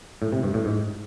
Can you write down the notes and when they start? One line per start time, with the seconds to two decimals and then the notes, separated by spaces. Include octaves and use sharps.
0.22 A2
0.32 C3
0.43 G2
0.54 A2
0.65 G#2